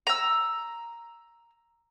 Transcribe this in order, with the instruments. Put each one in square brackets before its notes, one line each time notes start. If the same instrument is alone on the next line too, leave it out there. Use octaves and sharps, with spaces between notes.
[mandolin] A#5 E6